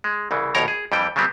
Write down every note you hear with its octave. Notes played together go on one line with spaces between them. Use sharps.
G#3
C2 C#3 E3
A#1 D#2 B2 A#4 C#5 A#5
G#4
F2 E3 G3 G5
C#3 F#3 G3 B3 C4